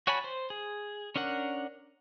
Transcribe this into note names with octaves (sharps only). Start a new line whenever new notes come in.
F#4 C#5 G#5 A5 B5
C5
G#4
C#4 D4 A#4 F#5